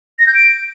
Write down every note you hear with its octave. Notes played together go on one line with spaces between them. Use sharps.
A#6
G6
D7